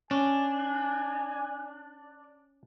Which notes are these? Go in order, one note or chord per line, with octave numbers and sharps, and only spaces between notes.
C#4 D4 G#5